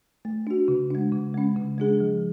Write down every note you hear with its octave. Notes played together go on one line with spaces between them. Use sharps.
A3
D4 F#4
C#3
G#3 D4
C#3
G#3 C#4
C#3
G#3 D4 G#4
F3